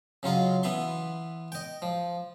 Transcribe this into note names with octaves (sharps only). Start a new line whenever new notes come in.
C#3 F#3 F4 D#5
E3 B3 E5 C6
D#5 G5
F3